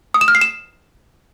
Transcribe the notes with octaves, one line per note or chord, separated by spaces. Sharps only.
D#6
E7
F6
C7
E7